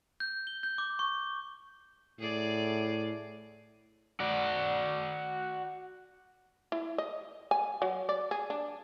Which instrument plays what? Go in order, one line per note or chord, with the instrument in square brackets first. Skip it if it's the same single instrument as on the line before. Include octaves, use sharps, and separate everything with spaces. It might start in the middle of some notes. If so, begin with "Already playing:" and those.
[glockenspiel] G6
G7
G6
D6
C#6
[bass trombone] A2 [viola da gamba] G#4 D5
[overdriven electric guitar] F#4 D5
[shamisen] E4
D#5
G#5
F#3
D5
G#4
D4